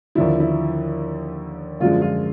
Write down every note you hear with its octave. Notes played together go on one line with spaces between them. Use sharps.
D#2 D3 F3 E4
E4
F#2 D3 F3 G#3 F4
F4